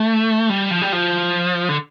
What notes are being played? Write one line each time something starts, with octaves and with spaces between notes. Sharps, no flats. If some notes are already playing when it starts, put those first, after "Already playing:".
Already playing: A3
G3
F3
G3
F3
D3